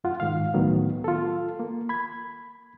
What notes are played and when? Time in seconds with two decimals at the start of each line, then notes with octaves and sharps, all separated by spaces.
0.04 F#2 F4 F#5
0.20 G#2 D#3 F5
0.54 C#2 A2 D#3 F#3 B3
1.04 F4 A4
1.60 A#3
1.89 B5 G#6